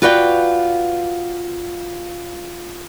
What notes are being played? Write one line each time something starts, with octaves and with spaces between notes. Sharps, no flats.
F4 F#4 B4 D5 D#5 G5